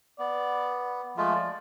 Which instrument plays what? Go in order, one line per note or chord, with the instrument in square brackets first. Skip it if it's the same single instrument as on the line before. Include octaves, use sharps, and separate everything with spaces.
[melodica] B3 [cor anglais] D5
[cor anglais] F3 [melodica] G#3 A3 F4
[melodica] D5